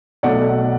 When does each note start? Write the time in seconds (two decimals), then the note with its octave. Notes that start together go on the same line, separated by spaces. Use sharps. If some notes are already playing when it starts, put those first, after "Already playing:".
0.23 B1 B2 F#3 A3 D5 F#5